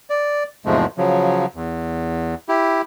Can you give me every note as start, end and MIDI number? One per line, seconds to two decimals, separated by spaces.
0.10 0.43 74
0.66 0.86 40
0.66 0.86 44
0.66 0.86 48
0.66 0.86 53
0.66 0.86 56
0.66 0.86 57
0.98 1.46 49
0.98 1.46 53
0.98 1.46 54
1.55 2.35 40
2.49 2.82 64
2.49 2.82 67